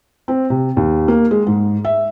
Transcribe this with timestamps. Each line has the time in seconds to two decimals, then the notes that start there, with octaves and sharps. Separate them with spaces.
0.28 C4
0.50 C3
0.77 D#2
1.08 A#3
1.31 G#3
1.47 G#2
1.85 E5